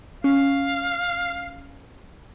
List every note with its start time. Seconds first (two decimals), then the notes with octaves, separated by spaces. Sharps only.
0.24 C#4 F5